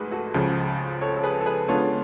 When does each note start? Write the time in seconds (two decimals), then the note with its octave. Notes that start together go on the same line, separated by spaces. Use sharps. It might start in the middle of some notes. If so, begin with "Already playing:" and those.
Already playing: G#2 A3 F#4 G#4 A4 B4
0.11 F#4 A4
0.34 C#2 C#3 F3
1.01 A4 C#5
1.17 A4
1.23 G#4 B4
1.41 A4
1.46 G#4 B4
1.68 C#3 G#3 B3 D4 F4 A4 C#5